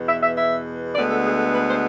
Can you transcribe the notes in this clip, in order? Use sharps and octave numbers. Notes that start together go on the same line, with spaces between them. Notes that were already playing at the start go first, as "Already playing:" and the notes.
Already playing: E2 B2 B3
E5
E5
E5
D2 D3 G#3 B3 D5
A4
G#4
A4
B4
C5